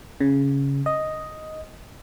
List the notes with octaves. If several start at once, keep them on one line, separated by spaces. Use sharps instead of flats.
C#3
D#5